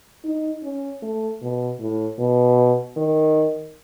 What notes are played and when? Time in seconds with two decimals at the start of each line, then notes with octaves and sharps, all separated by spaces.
0.25 D#4
0.63 C#4
1.02 A3
1.42 B2
1.80 A2
2.19 B2
2.97 D#3